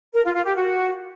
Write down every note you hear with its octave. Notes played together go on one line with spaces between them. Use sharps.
A#4
F4
F4
G4
F#4